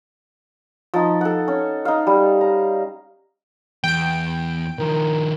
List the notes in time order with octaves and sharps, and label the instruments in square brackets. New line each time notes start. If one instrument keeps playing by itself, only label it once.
[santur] F3 D#4
A4 F#5
C#4
D#4 F5
G3
A#5
[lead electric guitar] E2 [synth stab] G5 D7
[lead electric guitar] D#3 F3 [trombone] A#4